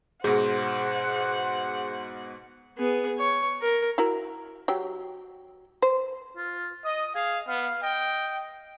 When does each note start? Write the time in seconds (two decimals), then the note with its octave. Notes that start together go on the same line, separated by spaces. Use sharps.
0.24 G#2 B2 G#4 C5 F#5
2.78 B3 G#4
3.18 C#5
3.62 A#4
3.98 E4 F#4 A#4
4.68 F#3 G4
5.82 C5
6.37 F4
6.85 D#5 D#6
7.15 G#4 F5
7.48 B3 F5
7.83 D#5 G5